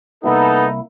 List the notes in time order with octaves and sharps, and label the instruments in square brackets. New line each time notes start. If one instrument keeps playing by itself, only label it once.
[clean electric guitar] C2 A#3 E4 [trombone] B3 [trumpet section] D#4 A4